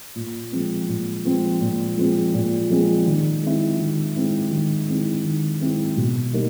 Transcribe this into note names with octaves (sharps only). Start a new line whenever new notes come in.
A#2
F3 G#3 C4
A#2
F3 G#3 C4
A#2
F3 G#3 C4
A#2
F3 G#3 C4
D#3
G#3 C4 E4
D#3
G#3 C4 E4
D#3
G#3 C4 E4
D#3
G#3 C4 E4
B2
G3 A#3 D#4